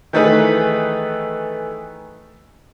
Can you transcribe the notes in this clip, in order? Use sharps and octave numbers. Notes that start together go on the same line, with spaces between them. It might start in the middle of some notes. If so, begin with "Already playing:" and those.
D#3 E3 A3 D#4 G#4 B4